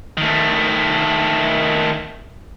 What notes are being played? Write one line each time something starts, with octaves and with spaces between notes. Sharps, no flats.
D#3 A3